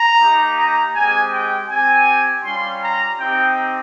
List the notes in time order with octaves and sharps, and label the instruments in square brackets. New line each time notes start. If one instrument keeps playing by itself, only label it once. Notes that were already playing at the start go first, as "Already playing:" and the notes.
Already playing: [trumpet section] A#5
A#3 D#4 G4
A#5
G#3 C4 G4 G#5
G5
C4 G4 G#5
G3 C#4 F4 C6
A#5
C4 D#4 G4 G5